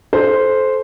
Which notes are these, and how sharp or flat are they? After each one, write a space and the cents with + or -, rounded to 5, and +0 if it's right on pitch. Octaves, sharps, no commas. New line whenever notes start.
A4 -25 C5 +0